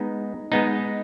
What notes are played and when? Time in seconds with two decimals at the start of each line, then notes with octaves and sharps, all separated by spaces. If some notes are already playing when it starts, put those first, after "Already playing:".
Already playing: G#3 B3 D#4
0.52 G#3 B3 D#4